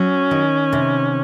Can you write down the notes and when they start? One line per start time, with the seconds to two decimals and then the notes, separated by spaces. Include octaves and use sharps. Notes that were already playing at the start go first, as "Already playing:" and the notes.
Already playing: F#3 C#4
0.31 D#3
0.73 C3